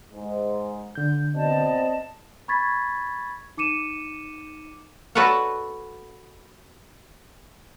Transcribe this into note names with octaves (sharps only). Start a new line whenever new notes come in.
G#2
D3 G6
B2 C4 D5 D#5 A5
B5 C#6 G#6 A6 B6
D#4 D6 C#7 D#7 E7
F#4 A4 B4 C#5 D5 F#5